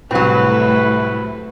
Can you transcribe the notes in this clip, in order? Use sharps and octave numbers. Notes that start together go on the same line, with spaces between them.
C2 A2 F#3 A3 C4 E4 A4 B4